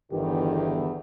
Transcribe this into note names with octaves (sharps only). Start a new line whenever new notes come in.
G1 E2 D#3 E3 G4